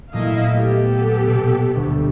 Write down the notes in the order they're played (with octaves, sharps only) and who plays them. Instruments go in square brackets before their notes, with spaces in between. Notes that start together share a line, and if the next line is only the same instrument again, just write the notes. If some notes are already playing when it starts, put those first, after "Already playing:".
[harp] A#2 F#3 A3 [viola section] E4 D#5 F5
[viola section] B3 G4 A4
[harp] B2
D2 G3